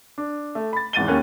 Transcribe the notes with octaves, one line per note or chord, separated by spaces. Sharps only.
D4
A3
B5 A6
G#1 E2 A6 D#7 G7
D#2 A#3 C#4 F#6